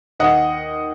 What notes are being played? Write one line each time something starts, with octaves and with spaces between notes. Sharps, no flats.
D#2 D#5 F#5